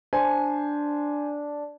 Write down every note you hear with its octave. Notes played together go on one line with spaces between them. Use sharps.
D4 C5 G#5